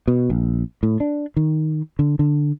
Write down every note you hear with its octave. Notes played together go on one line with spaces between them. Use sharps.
B2
A#1
A2
D4
D#3
D3
D3